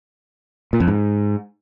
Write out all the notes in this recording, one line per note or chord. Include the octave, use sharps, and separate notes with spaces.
A#2
F2
G#2